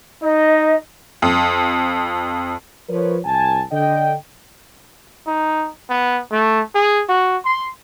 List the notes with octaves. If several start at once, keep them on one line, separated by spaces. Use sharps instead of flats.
D#4 D#5
F2
F3 A#4 B4 C#5
C2 G#5 A5
D3 D#5 G5
D#4
B3
A3
G#4
F#4
C6